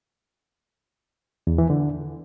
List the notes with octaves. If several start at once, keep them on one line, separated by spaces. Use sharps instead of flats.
E2
E3
D3